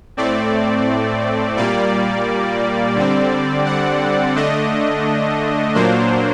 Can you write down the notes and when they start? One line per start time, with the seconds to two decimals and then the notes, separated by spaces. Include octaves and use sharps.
0.17 A2 A3 C4 D5
1.57 A#2 G3 A#3 D5
2.96 D3 G3 C4
3.66 F#5
4.36 D3 A3 D4 D#5
5.75 A#2 F#3 A#3 D4 C5